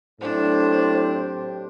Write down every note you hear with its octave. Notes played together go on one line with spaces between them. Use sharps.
A2 F#3 C4 D4 G4 C5